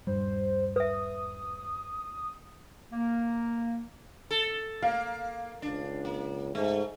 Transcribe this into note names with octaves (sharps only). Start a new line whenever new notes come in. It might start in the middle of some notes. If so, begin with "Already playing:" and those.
D#1 G2 G3 C5
B4 E5 D#6
A#3
A4
A#3 F5
C#2 D4
A#3
G#2 A3